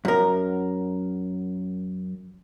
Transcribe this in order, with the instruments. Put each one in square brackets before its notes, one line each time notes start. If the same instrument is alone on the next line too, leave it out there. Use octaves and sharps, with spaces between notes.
[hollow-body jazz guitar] F#2 A#4